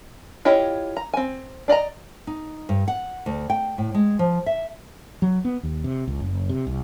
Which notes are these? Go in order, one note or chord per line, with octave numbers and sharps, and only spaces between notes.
E4 F4 G4 C#5 D#5
A#5
C4 G#5
D4 D5 D#5 A#5
D#4
G2
F#5
D2
G5
A2
G#3
F3
E5
F#3
B3
D#2
C3
C#2
F#1
C3
C2